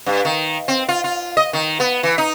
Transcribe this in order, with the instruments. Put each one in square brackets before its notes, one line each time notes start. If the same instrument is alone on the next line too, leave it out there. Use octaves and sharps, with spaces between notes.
[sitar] G2
D#3
C4
F4
F4
D#5
D#3
B3
E3
D#4